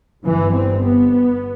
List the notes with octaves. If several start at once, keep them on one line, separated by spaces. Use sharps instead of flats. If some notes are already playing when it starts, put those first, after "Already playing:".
G1 G2 E3
C4
B3